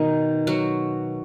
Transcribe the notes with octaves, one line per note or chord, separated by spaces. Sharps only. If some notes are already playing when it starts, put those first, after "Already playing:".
Already playing: B2 D#3 D#4
F#3 F#4